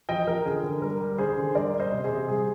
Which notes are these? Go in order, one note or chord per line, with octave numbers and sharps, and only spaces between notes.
F3 D#5 G5
F3 A#4
D3 G#4
D3 A#4
G3 A#4
G3
D3 G#4 C5
D3
G3 A#4 D5
G3
C5 D#5
C3
G#4 C5
C3
G3 G#4